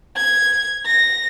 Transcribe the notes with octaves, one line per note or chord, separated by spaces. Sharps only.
G#6
A#6